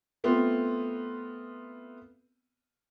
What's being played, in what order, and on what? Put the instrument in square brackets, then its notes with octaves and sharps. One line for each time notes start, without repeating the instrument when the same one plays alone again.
[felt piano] A3 B3 C4 F4